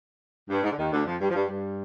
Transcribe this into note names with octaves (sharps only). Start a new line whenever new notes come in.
G2
G#2
D3
D#2 D#3
D2 D3
F2 F3
G2 G3
F3
G2 G3
G2 G3